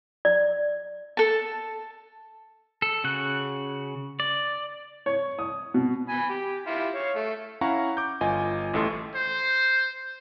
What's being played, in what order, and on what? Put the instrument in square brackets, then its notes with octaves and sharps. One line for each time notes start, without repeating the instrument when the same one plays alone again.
[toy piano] D5
[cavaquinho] A4 A5
[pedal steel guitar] A4
C#3 F#4 F#6
D5
[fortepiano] C#5
D#6
B2
[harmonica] G#5 B5
G4
E4 F4 G4
C#5 F5
A3
[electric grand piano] C#4 E4 F5 F#5 A#5 C#6
D6 G6
G1 F4 D#5 G#5
A1 A2 A4 C6
[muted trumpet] C5